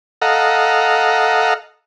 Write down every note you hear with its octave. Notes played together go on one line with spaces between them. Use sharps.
A4 D#5 F5 F#5 A#5